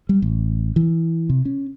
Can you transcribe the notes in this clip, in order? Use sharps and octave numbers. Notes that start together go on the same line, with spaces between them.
G3
A1
E3
C3
C#4